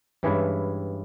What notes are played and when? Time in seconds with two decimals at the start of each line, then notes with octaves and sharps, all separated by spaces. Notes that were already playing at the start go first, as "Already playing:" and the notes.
0.23 G2 E3 G#3 C#4 E4